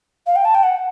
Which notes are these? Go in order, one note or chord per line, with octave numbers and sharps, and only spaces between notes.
F5
G5
A5
G5
F#5